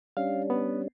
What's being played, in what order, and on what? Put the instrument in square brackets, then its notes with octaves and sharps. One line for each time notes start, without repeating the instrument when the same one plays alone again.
[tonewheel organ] G3 C#4 D4 [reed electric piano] F5
[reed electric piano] B3